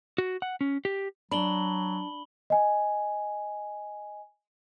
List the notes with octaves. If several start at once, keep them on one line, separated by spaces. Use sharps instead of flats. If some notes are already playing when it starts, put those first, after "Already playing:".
F#4
F#5
C#4
G4
F#3 D4 B5 F#7 G7
D#5 G#5